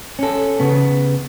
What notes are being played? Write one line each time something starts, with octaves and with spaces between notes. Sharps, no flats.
C#4 A4
C#3 B3